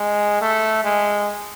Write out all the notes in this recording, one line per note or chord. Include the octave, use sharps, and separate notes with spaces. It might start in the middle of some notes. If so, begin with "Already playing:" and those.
Already playing: G#3
A3
G#3